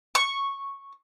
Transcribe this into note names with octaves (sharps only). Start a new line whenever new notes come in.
C#6